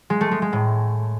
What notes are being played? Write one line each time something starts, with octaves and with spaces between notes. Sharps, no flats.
G#3
A3
G#3
G#3
A2